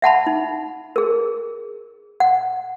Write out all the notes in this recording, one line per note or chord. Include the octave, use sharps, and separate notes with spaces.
E5 F#5 A5 B5
D#4
G#4 A#4
F#5